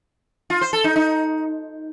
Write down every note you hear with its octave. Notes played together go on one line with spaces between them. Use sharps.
F4
C5
A4
D#4
D#4